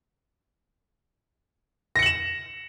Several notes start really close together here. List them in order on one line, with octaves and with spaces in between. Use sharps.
A#6 C#7 F#7 E7